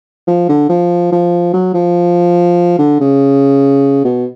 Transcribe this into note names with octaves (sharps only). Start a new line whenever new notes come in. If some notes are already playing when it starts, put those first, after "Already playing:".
F3
D3
F3
F3
F#3
F3
D3
C#3
B2